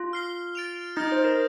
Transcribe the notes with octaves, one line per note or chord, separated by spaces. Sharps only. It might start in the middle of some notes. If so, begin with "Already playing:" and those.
Already playing: F4
F6 C7 G7
A6 D7 F7
D#4 D#6 G6 A#6
C5
A#4